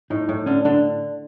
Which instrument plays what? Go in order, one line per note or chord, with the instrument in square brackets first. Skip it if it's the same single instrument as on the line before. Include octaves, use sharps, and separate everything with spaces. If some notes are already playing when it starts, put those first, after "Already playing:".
[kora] A2 [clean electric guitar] D#4
[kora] A2
[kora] D3 [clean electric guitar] C#4
[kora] D3 [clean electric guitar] D4